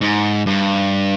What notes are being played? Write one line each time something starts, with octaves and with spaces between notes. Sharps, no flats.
G#2
G2